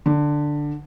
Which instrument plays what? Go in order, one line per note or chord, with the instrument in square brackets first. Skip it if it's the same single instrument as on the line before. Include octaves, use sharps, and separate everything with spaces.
[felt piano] D3